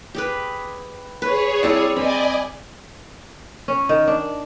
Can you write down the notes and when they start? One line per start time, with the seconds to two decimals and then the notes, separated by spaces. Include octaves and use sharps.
0.15 G4 G#4 B4
1.22 G#4 B4 C#5
1.63 G3 C4 E4 D5 A5
1.96 C4 D5 D#5 G#5 B5
3.68 C#4
3.89 D#3
4.08 D4